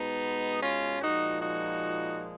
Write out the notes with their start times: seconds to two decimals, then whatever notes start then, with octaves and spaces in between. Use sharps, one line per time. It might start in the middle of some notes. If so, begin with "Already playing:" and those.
Already playing: B2 G#3 B3 D#4
0.61 C#4 F4
1.01 A#2 F3 G#3 D#4 F#4
1.41 D#4 F#4